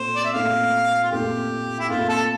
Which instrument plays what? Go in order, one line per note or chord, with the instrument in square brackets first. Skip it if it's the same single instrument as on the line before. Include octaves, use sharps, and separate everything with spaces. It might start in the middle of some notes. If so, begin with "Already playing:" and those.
Already playing: [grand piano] A#2 A3 C4 [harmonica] C5
[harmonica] D5
E5
[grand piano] A#2 A3 C4 [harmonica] F5
[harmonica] F4
[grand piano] A#2 A3 C4 [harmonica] G4
[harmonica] E4
[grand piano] A#2 A3 C4 [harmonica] F4
[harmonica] A4